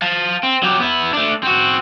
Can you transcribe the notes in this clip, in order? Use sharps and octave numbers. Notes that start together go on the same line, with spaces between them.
F5 A5
C4
F#3 G4
B3 E4
A3 D4
C4 F#4